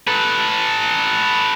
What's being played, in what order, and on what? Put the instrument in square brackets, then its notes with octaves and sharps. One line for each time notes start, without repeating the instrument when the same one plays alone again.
[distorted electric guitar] A4 B4